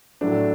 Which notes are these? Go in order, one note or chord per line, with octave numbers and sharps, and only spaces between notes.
A2 F#3 A3 D4